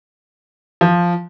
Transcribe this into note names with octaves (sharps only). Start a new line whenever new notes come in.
F3